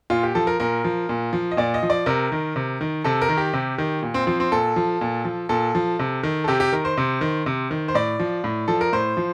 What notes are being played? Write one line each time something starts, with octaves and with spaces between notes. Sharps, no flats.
A#2 F4
G4
F3 A4
A#4
A#2 A#4
F3
A#2
F3
D#5
A#2 D5
D#5
F3
D5
C3 A#4
D#3
C3
D#3
C3 A4
A#4
D#3
G4
C3
D#3
A#2
C4
F3 C4
C4
A#2 A4
F3
A#2
F3
A#2 A4
F3
C3
D#3
A4
C3 G4
G4
D#3 A#4
C5
C3
D#3
C3
D#3
C5
A2 D5
F3
A2
F3 A4
A#4
A2 C5
F3